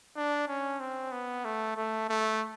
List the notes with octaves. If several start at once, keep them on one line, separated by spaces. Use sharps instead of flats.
D4
C#4
C4
B3
A3
A3
A3